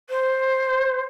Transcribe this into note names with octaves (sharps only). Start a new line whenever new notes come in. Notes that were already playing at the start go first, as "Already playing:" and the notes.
C5